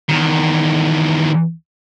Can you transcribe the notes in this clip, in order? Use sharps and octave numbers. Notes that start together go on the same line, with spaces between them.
E2 D#3